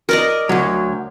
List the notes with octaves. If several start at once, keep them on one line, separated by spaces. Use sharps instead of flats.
A#4 D5 D#5
D2 F#3